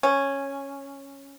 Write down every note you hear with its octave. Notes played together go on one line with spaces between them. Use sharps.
C#4